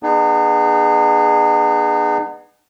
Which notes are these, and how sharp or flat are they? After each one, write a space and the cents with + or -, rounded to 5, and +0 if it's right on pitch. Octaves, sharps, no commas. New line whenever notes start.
B3 +0 D#4 -40 G#4 +0